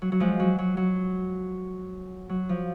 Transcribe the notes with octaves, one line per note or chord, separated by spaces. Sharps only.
F#3
F#3
F3 G#3
F#3
F#3
F#3
F#3
F3